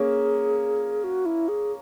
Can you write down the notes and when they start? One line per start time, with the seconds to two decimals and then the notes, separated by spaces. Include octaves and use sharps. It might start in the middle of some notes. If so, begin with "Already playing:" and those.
Already playing: A#3 C#4 G#4
1.04 F#4
1.26 E4
1.48 G#4